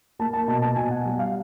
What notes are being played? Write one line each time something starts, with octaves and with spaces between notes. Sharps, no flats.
A#3 A5
A5
B2 A5
A5
B2 G#5
F#5
G3
F5